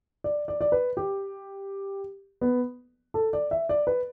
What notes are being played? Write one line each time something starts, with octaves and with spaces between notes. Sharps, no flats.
D5
D5
D5
B4
G4
B3
A4
D5
E5
D5
B4